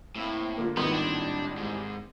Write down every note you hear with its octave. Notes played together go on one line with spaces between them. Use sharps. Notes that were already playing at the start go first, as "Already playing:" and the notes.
A2 A#3 C4 E4
D3 A#3 F4
G#1 A2 D#3 G3 B3 C6
D4
G#2